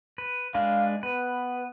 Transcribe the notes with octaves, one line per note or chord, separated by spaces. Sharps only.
B4
G#3 D4 B4 F5
B3 B4